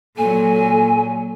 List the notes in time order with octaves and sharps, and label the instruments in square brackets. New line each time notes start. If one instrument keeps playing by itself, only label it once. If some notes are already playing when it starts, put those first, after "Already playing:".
[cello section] A#2 F#3 [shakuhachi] A4 [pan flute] G#5